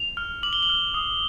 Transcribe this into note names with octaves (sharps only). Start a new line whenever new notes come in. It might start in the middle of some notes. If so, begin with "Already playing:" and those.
Already playing: F7
F6
D6 F#7
G7
F#7
F6
D#6